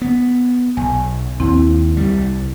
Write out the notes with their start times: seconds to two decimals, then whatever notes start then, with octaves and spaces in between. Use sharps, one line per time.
0.02 B3
0.77 B1 G#5
1.40 D#2 C4 E4
1.97 C2 G3